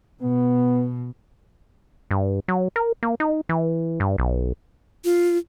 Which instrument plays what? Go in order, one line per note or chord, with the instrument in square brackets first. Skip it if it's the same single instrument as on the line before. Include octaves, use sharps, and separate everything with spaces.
[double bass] B2 [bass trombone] B3
[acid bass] G2
F#3
A#4
A#3
D#4
E3
G2
B1
[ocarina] F4